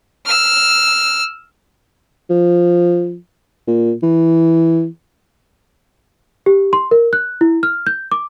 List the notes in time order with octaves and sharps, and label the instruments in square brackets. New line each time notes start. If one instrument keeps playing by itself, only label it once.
[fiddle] E6 F6
[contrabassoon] F3
A#2
E3
[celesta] G4
C6
A#4
F#6
E4
F6
G6
D6